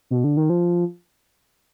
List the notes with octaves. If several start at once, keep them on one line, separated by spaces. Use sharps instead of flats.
B2
D3
D#3
F3